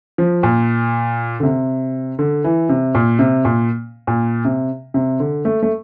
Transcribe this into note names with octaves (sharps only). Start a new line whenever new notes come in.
F3
A#2
D3
C3
D3
E3
C3
A#2
C3
A#2
A#2
C3
C3
D3
A3
A3